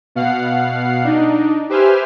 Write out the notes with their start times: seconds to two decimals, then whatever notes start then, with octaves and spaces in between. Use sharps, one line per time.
0.15 B2 F5 F#5 C7
1.04 D4 D#4
1.69 G4 B4 C5 E5 G#5 F6